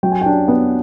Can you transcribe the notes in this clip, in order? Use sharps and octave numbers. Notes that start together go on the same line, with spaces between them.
F#3 G5
G#5
D4 G5
B3